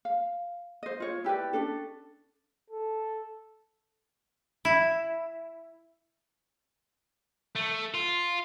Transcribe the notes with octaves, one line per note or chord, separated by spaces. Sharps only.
F5
C5 D#5
F4 C#5
E4 G4 B4 D5
C#4 D4 A4
A4
E4
A3
F4